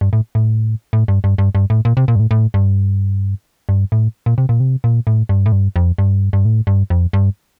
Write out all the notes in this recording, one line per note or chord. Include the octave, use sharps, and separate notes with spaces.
G2
A2
A2
A2
G2
G2
G2
G2
A2
A#2
C3
A#2
G2
A2
A2
G2
G2
A2
A#2
C3
A#2
C3
A#2
A2
G2
A2
G2
F2
G2
G2
A2
G2
F2
G2